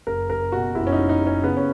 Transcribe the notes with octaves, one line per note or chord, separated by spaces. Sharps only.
F#1 A#4
F#1 A#4
B2 F#4
F#1 E4
C#4
D#4
F#1
D#4
F#1
C#4
C#3 B3
C#4